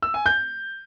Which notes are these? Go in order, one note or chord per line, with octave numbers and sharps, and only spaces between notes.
E6
G#5
G6